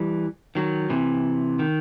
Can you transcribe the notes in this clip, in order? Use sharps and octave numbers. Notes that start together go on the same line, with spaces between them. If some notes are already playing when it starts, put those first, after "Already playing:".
Already playing: E3 G3
D#3 F#3
C3 E3
D#3